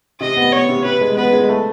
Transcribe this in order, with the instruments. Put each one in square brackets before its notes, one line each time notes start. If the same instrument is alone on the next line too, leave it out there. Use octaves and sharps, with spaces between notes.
[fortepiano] C3 [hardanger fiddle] D#5
[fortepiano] B3
[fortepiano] B3 [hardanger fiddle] C#5
[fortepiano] C3
[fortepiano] C3 [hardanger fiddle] B4
[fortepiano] G#3
[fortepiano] B3 [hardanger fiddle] B4
[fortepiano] G#3
A3